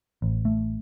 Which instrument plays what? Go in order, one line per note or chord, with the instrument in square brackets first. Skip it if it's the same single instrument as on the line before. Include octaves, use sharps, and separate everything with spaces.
[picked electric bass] A1
A3